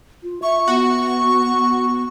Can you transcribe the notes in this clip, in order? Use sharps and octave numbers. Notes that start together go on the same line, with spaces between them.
F4
E5 C#6
B3 F#4